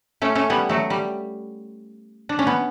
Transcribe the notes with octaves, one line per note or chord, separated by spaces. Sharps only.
A3 C#4
A3 C#4
G3 B3
F#3 A3
G3
D4
C#4
B3